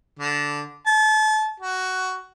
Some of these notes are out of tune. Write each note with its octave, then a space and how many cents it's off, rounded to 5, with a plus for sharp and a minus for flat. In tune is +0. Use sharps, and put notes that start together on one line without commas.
D3 -10
A5 -30
F#4 +10